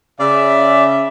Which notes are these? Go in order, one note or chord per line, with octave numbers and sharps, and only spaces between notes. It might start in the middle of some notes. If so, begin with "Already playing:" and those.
C#3 D5 E5